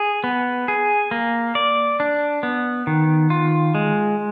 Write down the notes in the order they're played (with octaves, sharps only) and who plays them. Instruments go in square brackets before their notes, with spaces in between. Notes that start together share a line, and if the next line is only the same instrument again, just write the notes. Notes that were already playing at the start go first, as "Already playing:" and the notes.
Already playing: [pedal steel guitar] G#4
B3
G#4
A#3
D5
D4
B3
D#3
F4
G#3